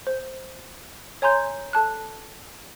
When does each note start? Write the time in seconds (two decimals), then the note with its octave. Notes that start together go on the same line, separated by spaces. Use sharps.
0.07 C5
1.22 C#5 G#5 A#5 C6 G6
1.73 A4 A5 F#6